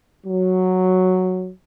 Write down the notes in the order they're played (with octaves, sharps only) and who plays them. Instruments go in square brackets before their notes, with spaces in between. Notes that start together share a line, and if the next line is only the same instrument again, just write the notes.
[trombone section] F#3